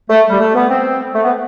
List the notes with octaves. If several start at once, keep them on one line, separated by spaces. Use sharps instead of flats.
A3
G3
A3
B3
C4
A3
B3